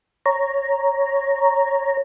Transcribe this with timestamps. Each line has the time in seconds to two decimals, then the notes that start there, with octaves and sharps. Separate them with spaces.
0.26 C#5 A#5